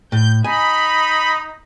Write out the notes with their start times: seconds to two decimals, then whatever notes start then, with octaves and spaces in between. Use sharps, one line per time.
0.12 A2 G6
0.44 D#4 G#5 B5